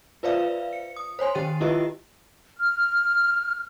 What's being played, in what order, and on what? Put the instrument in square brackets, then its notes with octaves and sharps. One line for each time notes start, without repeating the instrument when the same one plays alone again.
[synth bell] F4 B4 C5 D5 E5 F5
C#7
D#6
C5 C#5 G#5 C6
D#3 G4 G5 A6 D#7
E4 F4 G4 B4 D#5 E5
[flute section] F6